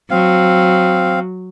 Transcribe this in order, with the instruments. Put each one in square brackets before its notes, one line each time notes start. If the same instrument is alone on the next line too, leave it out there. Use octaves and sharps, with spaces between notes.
[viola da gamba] F#3 [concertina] C4 F5